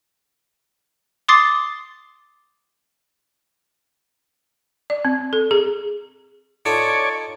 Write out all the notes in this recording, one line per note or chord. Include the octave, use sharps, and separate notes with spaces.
C6 D6 D#6 A6 C7
D5
C4
A4
G#4
D#4 F4 A4 C#5 D5